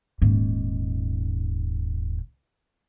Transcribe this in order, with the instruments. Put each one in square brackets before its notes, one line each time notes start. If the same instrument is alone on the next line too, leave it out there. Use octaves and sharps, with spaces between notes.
[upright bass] D#1 G#2